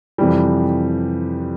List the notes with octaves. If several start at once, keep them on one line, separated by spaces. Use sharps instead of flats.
F2 C3 E3 G3